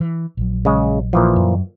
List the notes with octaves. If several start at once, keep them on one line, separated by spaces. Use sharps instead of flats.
E3
A#1 F#3
C#3 G#3
A#2 E3 F3
F#2